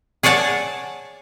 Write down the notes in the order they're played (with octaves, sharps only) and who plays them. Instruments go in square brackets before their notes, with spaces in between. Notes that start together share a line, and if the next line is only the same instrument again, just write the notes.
[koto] G#4 C#5 D5 F#5 A5